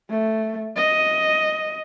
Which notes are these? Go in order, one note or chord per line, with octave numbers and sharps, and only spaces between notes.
A3
D#5